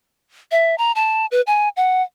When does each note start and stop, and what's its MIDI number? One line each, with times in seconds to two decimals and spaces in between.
0.51 0.75 76
0.78 0.92 82
0.95 1.26 81
1.31 1.41 71
1.47 1.69 80
1.77 2.02 78